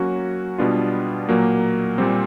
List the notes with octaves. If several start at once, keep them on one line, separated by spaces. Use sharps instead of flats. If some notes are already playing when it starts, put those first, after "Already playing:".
Already playing: F#3 A#3 C#4 F#4
B2 G3 B3 D4 F4
A#2 F#3 A#3
A#2 G3 C4